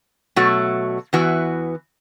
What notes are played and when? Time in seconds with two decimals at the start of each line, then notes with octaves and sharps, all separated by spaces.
0.36 B2 F#3 A3 F#4
1.13 E2 E3 B3 F#4